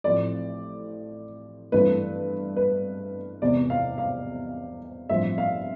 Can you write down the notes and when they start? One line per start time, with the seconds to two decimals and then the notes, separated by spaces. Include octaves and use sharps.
0.04 A1 A2 F3 C4 D5
1.72 G2 E3 A3 C4 B4
2.56 B4
3.42 E1 E2 C3 D5
3.70 F5
3.98 F5
5.09 A1 G2 F3 C4 E5
5.38 F5